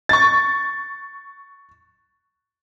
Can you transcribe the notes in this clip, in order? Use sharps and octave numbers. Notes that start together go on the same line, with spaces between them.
C#6 A6